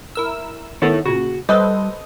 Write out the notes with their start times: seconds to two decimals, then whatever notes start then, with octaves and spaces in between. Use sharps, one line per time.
0.15 E4 A#4 E6
0.82 D#3 B3 E4 A4 C#5
1.06 A#2 C#3 F#4
1.49 G3 A4 B4 C5 D#5